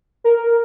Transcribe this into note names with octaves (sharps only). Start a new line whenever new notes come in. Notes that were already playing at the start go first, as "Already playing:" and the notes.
A#4